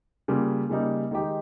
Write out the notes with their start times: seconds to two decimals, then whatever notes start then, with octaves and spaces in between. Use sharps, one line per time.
0.28 C#3 G3 A#3 F4
0.69 C#3 G3 A#3 D#4
1.11 D#3 G#3 D#4 G4